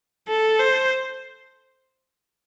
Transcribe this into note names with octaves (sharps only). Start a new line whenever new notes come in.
A4
C5